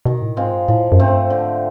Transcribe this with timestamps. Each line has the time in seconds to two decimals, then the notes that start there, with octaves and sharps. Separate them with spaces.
0.05 B2 D#3
0.22 A2
0.36 G#2 G#3 C4 F4
0.52 G2
0.68 A2 F3
0.92 F#2
0.99 G2 A3 C4
1.30 G#2 D3